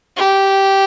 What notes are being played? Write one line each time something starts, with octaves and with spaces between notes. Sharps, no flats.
G4